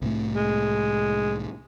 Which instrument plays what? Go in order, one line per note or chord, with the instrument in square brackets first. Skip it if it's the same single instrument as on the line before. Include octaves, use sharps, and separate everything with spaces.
[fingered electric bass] C2 A2 A3
[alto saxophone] G#3